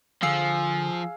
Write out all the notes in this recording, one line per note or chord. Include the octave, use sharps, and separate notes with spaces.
D3 F3 G#4 F5 E6 C7